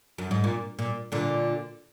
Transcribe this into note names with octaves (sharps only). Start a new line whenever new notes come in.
F#2
G#2
A#2
A#2
A#2 D3